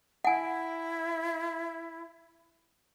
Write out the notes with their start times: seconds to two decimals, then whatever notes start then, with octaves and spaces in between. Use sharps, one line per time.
0.25 E4 F#5 G#5